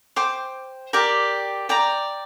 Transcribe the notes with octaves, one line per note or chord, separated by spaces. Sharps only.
C5 G5 D6
G4 A#4 D5 G5
D5 G5 A#5